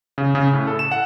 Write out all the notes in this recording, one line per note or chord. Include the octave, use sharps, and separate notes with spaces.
C#3
C#3
A2
A4
E7
F#5